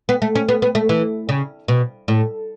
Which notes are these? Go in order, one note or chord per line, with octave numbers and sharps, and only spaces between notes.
B3
A3
C#4
B3
B3
A3
E3
C#3
B2
A2